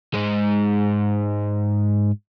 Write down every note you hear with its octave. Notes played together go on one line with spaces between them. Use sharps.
G#2 G#3